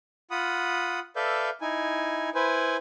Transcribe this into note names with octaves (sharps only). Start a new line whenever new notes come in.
F4 F#5 B5 D#6
A4 B4 D5 E5 F5 G6
D#4 E4 G#5
E4 B4 C5 G#5